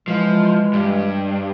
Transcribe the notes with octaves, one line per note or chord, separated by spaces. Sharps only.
E3 F3 G#3
G2